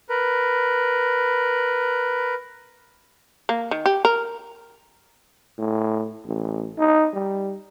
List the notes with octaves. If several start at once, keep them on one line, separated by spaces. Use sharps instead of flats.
A#4 B4
A#3
D#3
G4
A#4
A2
A1
D#4
G3